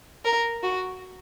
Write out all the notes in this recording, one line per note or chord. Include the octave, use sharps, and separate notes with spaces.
A#4
F#4